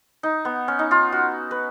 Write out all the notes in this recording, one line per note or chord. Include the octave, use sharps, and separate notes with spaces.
D#4
B3
C#4
D#4
F4
F#4
B4